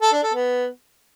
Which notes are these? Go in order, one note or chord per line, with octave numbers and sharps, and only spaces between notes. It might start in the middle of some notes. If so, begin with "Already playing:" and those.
A4
D4
A4
B3